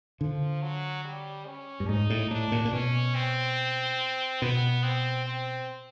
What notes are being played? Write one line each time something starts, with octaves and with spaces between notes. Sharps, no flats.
D3 F3
F#3
G3
C#4
G2
G#2 D#4
A2
A2 D4
A#2
A#2
B2 C#4
C4
B2 B3
C4
C4